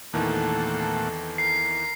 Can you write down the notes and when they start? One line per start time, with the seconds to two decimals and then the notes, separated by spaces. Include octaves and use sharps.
0.14 E2 A#2 D#3 E3 A3 C4 A4 F#5
1.38 A#4 C7